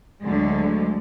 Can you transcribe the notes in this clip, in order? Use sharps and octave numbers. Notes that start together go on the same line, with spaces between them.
D2 D3 F#3 G#3